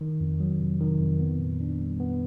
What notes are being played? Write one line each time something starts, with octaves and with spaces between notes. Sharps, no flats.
D#3
F2
F#3
C3
D#3
F2
B3
A#2
D4
G3
B3